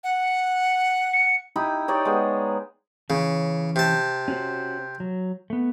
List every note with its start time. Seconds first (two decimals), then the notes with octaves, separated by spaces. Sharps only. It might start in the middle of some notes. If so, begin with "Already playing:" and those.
0.04 F#5
1.13 C#7
1.56 D#4 E4 G4 B5
1.88 D#4 G4 C#5 D5
2.05 G#3 B3
3.10 C#3 E3 C#4
3.76 C3 A5
4.28 C#4 F#4 C5
5.00 F#3
5.50 A3 B3